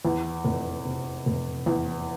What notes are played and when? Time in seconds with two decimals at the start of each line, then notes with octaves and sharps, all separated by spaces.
0.05 E2
0.45 F1
0.85 C3
1.26 F1
1.66 E2